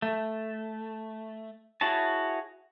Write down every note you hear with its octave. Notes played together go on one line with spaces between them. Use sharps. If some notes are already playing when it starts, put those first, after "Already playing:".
A3
E4 F#4 G#4 C#5 A5